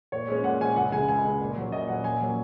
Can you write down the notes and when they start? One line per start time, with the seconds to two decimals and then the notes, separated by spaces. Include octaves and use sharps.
0.12 A#2 C#5
0.28 G#3 C#4
0.44 A#2 F#5
0.60 G#3 C#4 G#5
0.76 C#2 F#5
0.92 C#3 G#3 G#5
1.08 C#2 G#5
1.24 C#3 G#3
1.40 A#2
1.56 F#3 C#4
1.72 A#2 D#5
1.88 F#3 C#4 F#5
2.04 A#2 G#5
2.21 F#3 A#3 C#4